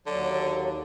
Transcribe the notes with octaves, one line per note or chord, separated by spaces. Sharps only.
D#2 D3 F#3